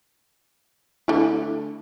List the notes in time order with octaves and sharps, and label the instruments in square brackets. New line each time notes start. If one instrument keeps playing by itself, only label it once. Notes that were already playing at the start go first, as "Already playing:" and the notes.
[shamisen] D3 A3 [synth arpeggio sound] E4